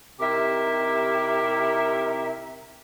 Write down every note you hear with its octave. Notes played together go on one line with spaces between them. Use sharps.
C3 D#4 E4 G4 A#4 E5